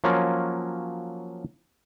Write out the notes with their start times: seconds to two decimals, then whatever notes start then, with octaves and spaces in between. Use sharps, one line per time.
0.04 F3 F#3 A#3 C#4 F4